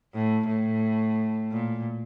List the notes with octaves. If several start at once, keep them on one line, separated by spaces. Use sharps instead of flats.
A2
A2
A#2